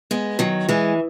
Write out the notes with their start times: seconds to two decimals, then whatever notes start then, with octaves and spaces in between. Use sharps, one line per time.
0.11 G#3 B3
0.39 D#3 F#3
0.69 E3 G#3